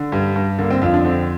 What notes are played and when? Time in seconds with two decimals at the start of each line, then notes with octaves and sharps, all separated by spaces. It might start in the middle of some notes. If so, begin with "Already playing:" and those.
Already playing: D3
0.12 G2 G3
0.36 G2
0.59 D3 A#3
0.70 C4
0.81 F2 F4
0.94 D4
1.05 D3 C4